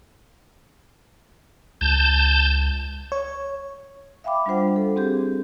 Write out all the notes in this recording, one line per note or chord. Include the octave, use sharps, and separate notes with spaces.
C#2 A5 G6
C#5
E5 F5 G5 B5 D6
G3 D4 F4 C5 F#5
A4
C4 G4 G#4 G6